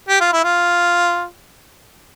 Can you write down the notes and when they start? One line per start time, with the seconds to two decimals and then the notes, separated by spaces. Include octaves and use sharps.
0.09 G4
0.21 F4
0.33 E4
0.44 F4